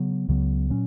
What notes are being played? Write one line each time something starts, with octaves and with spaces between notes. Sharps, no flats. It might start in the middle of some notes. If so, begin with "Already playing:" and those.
Already playing: C#3 F#3 B3
C#2 C#3 F#3 B3
A#2 F#3 C#4